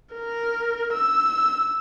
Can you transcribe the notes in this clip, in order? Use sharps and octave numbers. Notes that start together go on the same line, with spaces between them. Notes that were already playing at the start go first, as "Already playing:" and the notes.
A#4
E6